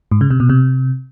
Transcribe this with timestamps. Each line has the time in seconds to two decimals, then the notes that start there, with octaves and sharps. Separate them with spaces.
0.12 G#2
0.21 C#3
0.30 C3
0.40 B2
0.49 C3